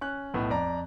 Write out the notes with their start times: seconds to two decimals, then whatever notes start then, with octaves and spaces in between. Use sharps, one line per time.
0.01 C#4 F#6
0.34 B1 A2 B3
0.50 F2 D5 A#5